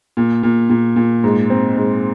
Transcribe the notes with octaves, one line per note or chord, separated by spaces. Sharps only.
A#2
A#2
A#2
A#2
G#2
C4
G#2